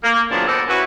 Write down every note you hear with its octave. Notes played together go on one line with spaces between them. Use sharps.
A#3
E2 A#2 D#3 F3 F#3 D4
D#2 B3 D4 A4 A#4 C5
C#4 E4 F#4 B4